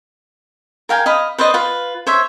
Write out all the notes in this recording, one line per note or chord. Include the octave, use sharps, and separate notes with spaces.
A#4 F5 G5 G#5
D#5 F5 B5
B4 C5 D5 D#5
F4 B4
C5 C#5 E5